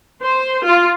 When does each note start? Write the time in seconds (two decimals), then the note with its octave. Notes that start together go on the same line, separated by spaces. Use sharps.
0.23 C5
0.65 F4